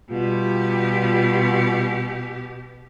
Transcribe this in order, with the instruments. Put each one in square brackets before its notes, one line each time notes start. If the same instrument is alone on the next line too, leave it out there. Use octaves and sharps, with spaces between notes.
[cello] B2 G4 [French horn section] G3 F4